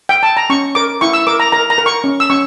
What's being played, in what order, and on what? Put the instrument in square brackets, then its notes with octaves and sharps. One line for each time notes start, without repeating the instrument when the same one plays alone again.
[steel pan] G5
A5
A#5
C#4 C#6
A#4 D6
E4 C#6
E6
A#4 D6
A#5
A#4 A#5
A#5
A#4
C#6
C#4
E6
C#4 C#6